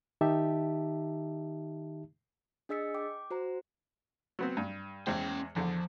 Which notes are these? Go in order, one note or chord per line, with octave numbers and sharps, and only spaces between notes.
D#3 D#4 G4 E5 A5
D4 G#4 D#5 E6 B6 C#7
G5 D6
F#4 C5 A#5
F#3 B3 C4
G2
E2 G#3 C#4 C5 G5
E2 D3 F3